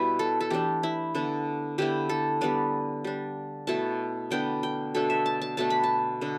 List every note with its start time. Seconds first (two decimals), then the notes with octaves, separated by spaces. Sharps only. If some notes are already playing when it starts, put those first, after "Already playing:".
Already playing: B2 G3 E4 B4
0.19 A4
0.41 A4
0.50 E3 A3 D4 G4
0.83 E4
1.15 D3 B3 D4
1.78 D3 B3 E4 G4
2.09 A4
2.41 G3 B3 D4 D5
3.04 G3 D4
3.67 B2 A3 E4 A5
4.31 D3 B3 D4 G5
4.63 G5
4.95 B2 A3 D4 A4
5.10 E5
5.26 A5
5.41 A5
5.57 B2 A3 D4 A5
5.70 B5
5.84 A5
6.21 D3 B3 D4